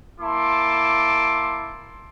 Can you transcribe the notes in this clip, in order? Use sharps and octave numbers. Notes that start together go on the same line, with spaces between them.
A#3 E4 A5 C6 D6